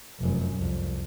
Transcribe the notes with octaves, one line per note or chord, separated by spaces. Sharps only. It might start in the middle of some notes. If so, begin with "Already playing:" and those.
F1 F#2
C2 F2